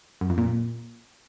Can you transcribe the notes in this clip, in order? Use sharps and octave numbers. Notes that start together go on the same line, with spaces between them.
F#2
F2
A#2